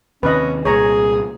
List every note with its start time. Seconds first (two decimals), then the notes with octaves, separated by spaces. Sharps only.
0.23 D#2 C3 C#4 B4 D#5
0.65 C2 A#2 G#4 C#5 A#5